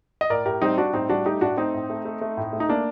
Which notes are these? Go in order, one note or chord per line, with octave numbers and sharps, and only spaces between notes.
D#5
A2 A#4 D5
A2 G4 A#4
G3 C4 D#4
G3 D4 F#4
A2 C4 D#4
G3 D4 F#4
A3 D#4 G4
A2 D4 F#4
A3 C4 D#4
A2
A3
A3
A3
A2
A3
D#4
A3 A#3 D4